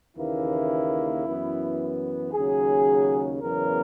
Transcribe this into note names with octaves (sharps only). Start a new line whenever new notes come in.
D#2 C#3 E3 A#3 E4
F#2 E3 B3
D#2 C#3 F#3 G#4
E2 C#3 F#3 B3 A#4